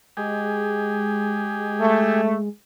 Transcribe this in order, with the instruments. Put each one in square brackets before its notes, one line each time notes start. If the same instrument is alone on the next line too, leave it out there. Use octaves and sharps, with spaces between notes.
[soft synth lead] G#3 [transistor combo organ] G4 G#4
[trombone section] A3